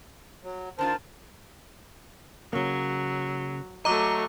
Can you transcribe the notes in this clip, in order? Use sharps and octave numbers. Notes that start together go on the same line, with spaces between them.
F#3
D#3 D4 F4 A#4 C5 A5
C#3 F#3 A#3
F#3 A3 D#5 A#5 D6